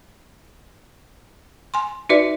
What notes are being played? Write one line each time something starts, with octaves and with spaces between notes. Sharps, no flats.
G#5 C6
D#4 F#4 B4 D5 E5